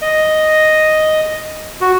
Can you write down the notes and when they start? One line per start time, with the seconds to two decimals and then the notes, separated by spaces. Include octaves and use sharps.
0.02 D#5
1.81 F#4